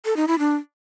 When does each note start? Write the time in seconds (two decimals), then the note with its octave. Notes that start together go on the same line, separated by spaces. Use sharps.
0.05 A4
0.17 D#4
0.28 E4
0.39 D4